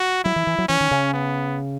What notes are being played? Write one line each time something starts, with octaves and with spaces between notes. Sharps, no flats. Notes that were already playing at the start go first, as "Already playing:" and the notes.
Already playing: F#4
F#3 E4
E3
E3
F#3
E3 C#4
D#3
C#3
B3